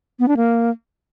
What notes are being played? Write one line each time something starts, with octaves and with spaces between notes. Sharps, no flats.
B3
D4
A#3